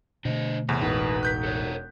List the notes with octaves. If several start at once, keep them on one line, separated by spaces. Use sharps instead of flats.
B2 D3 A3 D4 C5 D#5
E2 A2 C3
E1 A1 D#4 B4
F#6 G6 B6
A4 A#4 C#5